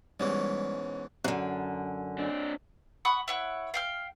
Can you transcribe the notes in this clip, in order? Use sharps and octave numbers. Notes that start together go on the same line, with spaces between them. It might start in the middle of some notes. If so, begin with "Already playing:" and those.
G#2 B2 E3 G3 G#3 C#4 D5
F#2 D3
C4 D4
F#5 B5 C#6 D#6
E4 C#5 F#5
F5 G5 F6